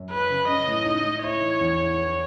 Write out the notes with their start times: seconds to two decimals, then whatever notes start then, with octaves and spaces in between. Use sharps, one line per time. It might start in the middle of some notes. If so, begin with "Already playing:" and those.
Already playing: F#2
0.10 G#4 B4
0.30 C#3
0.48 C#4 D#5
0.67 A2
0.85 D#4
1.05 A2
1.23 E4 C#5
1.41 E3
1.61 E2
1.80 E2
1.98 E3